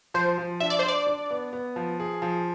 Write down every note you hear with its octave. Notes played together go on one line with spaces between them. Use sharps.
F3 C5
F3
D4 E5
D5
D4 C5
D5
D4
B3
B3
F3
G#4
F3